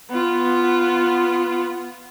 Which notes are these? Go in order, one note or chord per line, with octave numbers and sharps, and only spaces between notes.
B3 F4